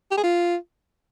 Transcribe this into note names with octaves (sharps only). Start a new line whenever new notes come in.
G4
G#4
F4